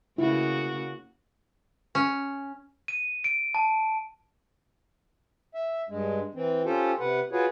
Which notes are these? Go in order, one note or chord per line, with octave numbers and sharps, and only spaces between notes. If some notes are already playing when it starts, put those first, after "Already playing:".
C#3 A#3 E4 F#4
C#4
D#7
D7
A5
E5
G2 G#3
E3 C4
C#4 F4 G4 A4 C5
C3 B4 F#5
F4 F#4 G#4 B4 C#5